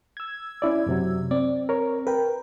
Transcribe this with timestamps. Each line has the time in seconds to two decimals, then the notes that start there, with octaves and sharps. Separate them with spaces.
0.17 E6 G#6
0.62 C#4 E4 D5
0.87 F#2 C3 F#3
1.31 C4 D5
1.69 A#4 C#5
2.07 A#4 B4 G5